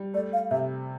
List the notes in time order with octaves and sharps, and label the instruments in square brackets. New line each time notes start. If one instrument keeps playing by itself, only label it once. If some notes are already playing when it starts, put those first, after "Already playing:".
Already playing: [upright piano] G3
[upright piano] A3 [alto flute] D5
[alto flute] F5
[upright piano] C3 [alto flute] E5